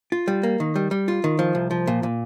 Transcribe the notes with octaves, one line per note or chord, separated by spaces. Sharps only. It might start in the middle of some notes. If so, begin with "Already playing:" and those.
F4
G3
A#3
D#3
G3
G3
F4
D#3
F3
C2
F3
A#2
A#2